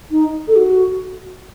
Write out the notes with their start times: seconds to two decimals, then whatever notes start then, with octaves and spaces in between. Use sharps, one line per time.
0.11 D#4
0.48 A4
0.56 F#4